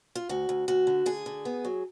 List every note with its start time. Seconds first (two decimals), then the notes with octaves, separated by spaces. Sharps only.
0.15 F4
0.29 D2 F#4
0.49 D2
0.68 D2 F#4
0.87 D3
1.06 D3 G#4
1.26 D3
1.45 B3
1.65 F#3